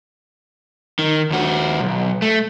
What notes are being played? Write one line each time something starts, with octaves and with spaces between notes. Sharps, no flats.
D#3
D#2 F#4
B1
A3